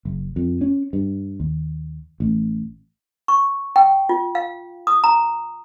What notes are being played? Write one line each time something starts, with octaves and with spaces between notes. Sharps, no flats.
F#1
F2
C#4
G2
D#2
A1
C#6
G5
F4
F5
D#6
A#5